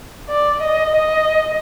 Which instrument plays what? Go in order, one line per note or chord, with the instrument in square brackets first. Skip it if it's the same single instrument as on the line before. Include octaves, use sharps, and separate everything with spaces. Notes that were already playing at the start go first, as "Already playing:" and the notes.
[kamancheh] D5
D#5
D#5